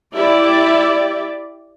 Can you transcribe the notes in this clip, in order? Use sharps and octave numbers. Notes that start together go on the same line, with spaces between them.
E4 G4 D5